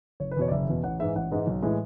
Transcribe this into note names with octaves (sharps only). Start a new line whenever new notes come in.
F#1 C#5
B4
E2 B2 C#5
D5
F#1 E5
E2 B2
A1 F#5
G#2 E3 G#3 E5
A1 F#5
G#2 E3 G#3
B1
A2 E3 G#3